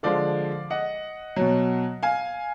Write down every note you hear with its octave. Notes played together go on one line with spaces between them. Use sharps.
D3 F3 G#3 D5 F5
D#5 F#5
B2 F#3
F5 G#5